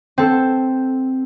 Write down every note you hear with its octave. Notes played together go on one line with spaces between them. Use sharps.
C4 A4